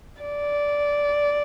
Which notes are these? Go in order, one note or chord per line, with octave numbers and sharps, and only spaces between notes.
D5